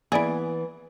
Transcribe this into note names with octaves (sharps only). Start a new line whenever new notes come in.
E3 A#3 B3 E4 G#4 D5 D7